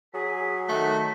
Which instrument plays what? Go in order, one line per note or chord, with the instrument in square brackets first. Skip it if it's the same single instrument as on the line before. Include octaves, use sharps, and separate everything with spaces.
[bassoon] F#3 [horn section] G#4 [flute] B6
[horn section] D#3 F#4 [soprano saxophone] A3 [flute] B6